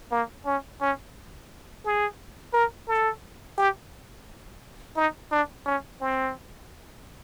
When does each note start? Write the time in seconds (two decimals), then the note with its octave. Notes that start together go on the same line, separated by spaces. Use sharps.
0.12 A#3
0.46 C#4
0.81 C#4
1.85 G#4
2.54 A#4
2.88 A4
3.58 G4
4.96 D#4
5.31 D4
5.66 C#4
6.01 C4